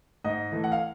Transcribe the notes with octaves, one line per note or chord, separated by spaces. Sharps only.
G#2 D#5
E3 A3
F#5
F5